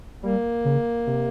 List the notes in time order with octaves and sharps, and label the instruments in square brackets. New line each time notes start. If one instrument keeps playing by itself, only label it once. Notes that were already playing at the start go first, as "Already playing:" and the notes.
[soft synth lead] G3 [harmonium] A#3
[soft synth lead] C#3
C3